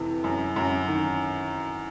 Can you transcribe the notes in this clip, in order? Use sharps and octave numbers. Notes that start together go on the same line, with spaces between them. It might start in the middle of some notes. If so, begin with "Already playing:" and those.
Already playing: F2 C3 E3
F#2
F#2
D#3